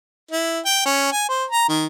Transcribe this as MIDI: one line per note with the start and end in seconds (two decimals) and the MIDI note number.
0.31 0.60 64
0.65 0.81 79
0.86 1.12 61
1.12 1.26 80
1.29 1.45 72
1.50 1.64 82
1.69 1.86 51